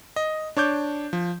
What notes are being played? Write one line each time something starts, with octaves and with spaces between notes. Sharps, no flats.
D#5
D4 C#5 D6 G6
F3